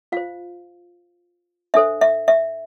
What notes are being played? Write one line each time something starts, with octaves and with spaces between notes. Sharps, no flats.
F4 C5 F5
D4 A4 C5 E5
E5
E5